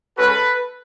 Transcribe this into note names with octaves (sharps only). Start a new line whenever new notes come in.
G#3 C#4 F#4 A4 B4